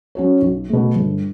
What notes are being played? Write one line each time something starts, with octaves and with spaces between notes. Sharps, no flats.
F#3 C#4 F#4 C#5
B1
B2 A3
G1